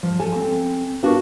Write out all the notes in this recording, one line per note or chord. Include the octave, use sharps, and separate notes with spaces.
F3
A4 G#5
C4
B3 D4 F4 F#4 A#4